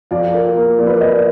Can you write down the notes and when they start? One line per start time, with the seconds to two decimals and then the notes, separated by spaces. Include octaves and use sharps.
0.11 F2 D5 F5
0.34 F4 A#4
0.57 A#3
0.79 F3 D5
0.87 B4
0.93 A#4 D5
1.01 F2 B4 D#5